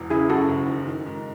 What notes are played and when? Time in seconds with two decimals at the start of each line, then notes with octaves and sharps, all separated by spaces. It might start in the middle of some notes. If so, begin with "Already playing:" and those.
Already playing: E1 E2
0.10 C#3 E4 G#4
0.29 F#2 F#4 A4
0.49 F#1
0.68 D#3
0.87 D#3
1.06 G#2